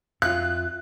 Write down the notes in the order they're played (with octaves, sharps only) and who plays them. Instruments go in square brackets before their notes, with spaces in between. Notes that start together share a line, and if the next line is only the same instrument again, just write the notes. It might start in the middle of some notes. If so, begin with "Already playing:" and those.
[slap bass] F2 [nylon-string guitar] F4 E5 F5 [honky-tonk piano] F#6